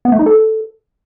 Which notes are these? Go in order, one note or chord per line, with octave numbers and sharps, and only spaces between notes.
B3
A3
D#4
A4